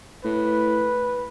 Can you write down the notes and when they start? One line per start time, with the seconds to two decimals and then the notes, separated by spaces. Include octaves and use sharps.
0.25 A2 B4